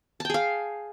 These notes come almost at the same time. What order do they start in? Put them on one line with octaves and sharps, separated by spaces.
A5 G5 G#4 F5